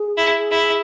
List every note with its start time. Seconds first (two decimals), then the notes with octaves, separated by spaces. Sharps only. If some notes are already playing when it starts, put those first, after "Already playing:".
Already playing: G#4
0.17 E4
0.51 E4